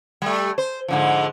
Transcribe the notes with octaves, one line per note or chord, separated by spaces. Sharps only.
G3 A3
C5
G#2 D3 F3